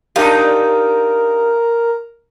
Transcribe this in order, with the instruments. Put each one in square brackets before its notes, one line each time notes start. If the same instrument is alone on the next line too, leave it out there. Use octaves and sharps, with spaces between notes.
[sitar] D4 D#4 G4 [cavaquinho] F4 [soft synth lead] A#4